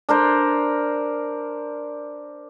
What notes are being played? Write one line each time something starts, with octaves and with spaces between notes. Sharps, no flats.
D4 A#4 C5